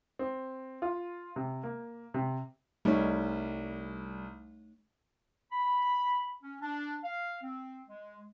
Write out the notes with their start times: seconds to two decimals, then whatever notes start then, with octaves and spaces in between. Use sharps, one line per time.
0.19 C4
0.82 F4
1.36 C3
1.63 A#3
2.14 C3
2.85 C2 G3 A3 D#4 C#5
5.51 B5
6.42 C#4
6.62 D4
7.04 F5
7.42 C4
7.88 G#3